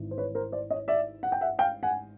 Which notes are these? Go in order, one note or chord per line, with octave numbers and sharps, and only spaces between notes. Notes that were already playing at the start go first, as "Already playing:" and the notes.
Already playing: G#1 G#2 E3
C5
B4 C#5
A#4 C5
C5 D5
C#5 D#5
D5 E5
F#5
G5
E5 F#5
F5 G5
F#5 G#5